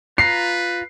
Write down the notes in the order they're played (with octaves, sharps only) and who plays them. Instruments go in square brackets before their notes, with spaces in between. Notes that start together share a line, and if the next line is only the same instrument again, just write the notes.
[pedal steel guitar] F4 A#5 [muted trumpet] B4 [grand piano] C7